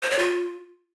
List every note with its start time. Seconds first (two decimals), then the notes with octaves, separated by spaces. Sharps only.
0.03 C5
0.11 C#5
0.19 F4